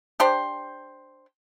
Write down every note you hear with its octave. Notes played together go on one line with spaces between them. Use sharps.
D4 G4 C5